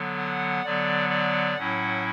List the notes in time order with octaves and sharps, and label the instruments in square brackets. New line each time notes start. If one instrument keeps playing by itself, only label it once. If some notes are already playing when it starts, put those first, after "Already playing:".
Already playing: [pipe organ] D3 F#3 B3
F#5
D3 F#3 B3 D5
D5
A2 F#3 C#4 E4 F#5